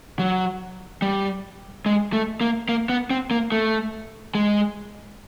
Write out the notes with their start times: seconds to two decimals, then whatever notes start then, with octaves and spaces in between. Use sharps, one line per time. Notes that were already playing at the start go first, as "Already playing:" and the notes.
0.19 F#3
1.02 G3
1.86 G#3
2.13 A3
2.41 A#3
2.69 A#3
2.89 B3
3.10 C4
3.31 A#3
3.52 A3
4.35 G#3